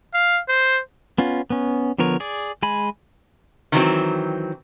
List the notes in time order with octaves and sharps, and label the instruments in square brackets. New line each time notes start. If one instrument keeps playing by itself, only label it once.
[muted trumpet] F5
C5
[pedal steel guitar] B3 C#4 F4
B3 C#4
D3 F3 B3 A#4 C#5
G#4 D5
G#3 G#5 B5
[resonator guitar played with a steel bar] D#3 E3 F#3 C4